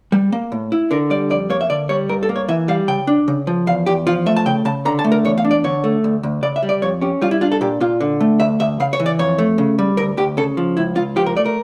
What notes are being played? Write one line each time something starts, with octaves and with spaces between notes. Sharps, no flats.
G3
A#3
A2
E4
D3 A#4
G3 D5
F2 D5
A#3 C#5
E5
D3 D5
G3 C#5
G2 A#4
A4
A#3
C#5
E3 E5
G3 F5
C#3 G5
D4
C#3
F3
E2 F5
E2 G4
F3 F4
A3 E5
A5
C#3 G5
C#3 A5
D3 A#5
A5
A3
A#4
E2 C#5
F5
D4
D5
D3 C#5
A3
D2
D2
C#3 D5
E5
G3
D5
F2 C#5
C#4 G4
G3 F4
E4
D4 F4
A4
A#2 G4
A#2 F4
D3
A3
D2 E5
D2 E5
C#3 F5
C#5
E3
D5
F2 C#5
A3
C#3
G3
D2 A#4
D2 G4
C#3 A4
F3
C#2 E4
C#2 F4
F3 G4
A#4
A3 D5
A#4